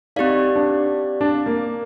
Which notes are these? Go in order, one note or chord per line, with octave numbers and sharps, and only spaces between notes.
C4 D#4 G4 D5 F5
D4
D4
A#3